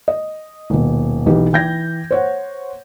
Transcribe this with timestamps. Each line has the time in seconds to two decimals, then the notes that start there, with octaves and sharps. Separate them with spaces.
0.08 D#5
0.70 D#1 B2
1.26 B1 E3 G4 B4
1.53 E3 G5 G6 G#6 A#6
2.11 C5 C#5 F#5